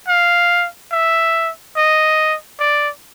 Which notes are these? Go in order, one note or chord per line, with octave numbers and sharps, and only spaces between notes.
F5
E5
D#5
D5